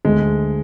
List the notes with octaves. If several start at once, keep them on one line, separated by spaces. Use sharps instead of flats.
D2 G#3